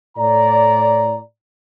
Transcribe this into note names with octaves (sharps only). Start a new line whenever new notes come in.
A2 D5 A#5